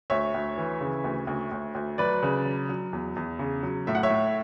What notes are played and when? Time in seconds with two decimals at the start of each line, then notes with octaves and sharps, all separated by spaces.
0.10 D2 C#5 E5
0.34 D2
0.58 E3
0.81 C#3
1.04 D2
1.27 D2
1.52 D2
1.75 D2
1.98 F#3 B4 D5
2.23 C#3
2.45 F#3
2.69 F#3
2.93 E2
3.16 E2
3.39 C#3
3.63 F#3
3.87 A2 E5
3.95 F#5
4.03 C#5 E5
4.10 A2